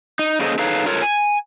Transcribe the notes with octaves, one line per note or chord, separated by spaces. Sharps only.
D#4
A#3 C#4 G#4 A4 C5 D#5
D#4 G#4 A4 B4 C#5 F5
F4 A4 A#4 C#5
G#5